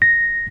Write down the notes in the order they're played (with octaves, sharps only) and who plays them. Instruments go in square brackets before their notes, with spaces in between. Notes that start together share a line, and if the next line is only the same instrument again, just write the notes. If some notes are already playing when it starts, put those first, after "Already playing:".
[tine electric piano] A#6